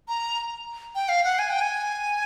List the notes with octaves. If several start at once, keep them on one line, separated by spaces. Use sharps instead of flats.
A#5
G5
F5
F#5
G#5
G5
G#5